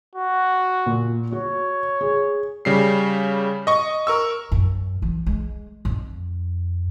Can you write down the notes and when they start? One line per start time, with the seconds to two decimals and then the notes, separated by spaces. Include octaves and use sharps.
0.15 F#4
0.86 A#2
1.32 F#4 C#5
2.01 G#4
2.65 C#3 G3 C7
3.67 D#5 C#6
4.07 A#4 C#6 E6
4.52 F#2
5.02 E3
5.26 G#3
5.85 F2